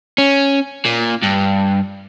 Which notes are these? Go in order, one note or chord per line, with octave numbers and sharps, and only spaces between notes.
C#4
A#2
G2